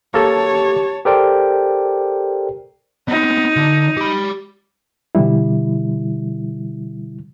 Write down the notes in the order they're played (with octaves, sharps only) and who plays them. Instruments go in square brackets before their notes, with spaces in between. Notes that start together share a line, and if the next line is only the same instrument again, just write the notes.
[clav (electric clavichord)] A#3 A4 [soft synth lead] G4 [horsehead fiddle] C#5 A5
[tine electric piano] G4 A4 A#4 C5 D5 G5
[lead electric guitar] B3 C4 [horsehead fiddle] D#4
[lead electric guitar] D3
G4 B5
[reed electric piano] B2 D3 E3 G3 E4